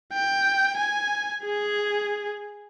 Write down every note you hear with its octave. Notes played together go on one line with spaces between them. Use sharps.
G5
G#5
G#4